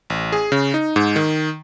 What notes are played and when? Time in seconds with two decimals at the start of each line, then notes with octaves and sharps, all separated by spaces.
0.10 A1
0.32 G#4
0.52 C#3
0.74 D#4
0.96 G#2
1.16 D#3